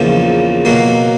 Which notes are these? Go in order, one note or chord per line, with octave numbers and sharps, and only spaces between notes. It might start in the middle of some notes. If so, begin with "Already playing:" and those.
Already playing: E2 C#3 F3 A#3 D#4
B2 F#3 A#3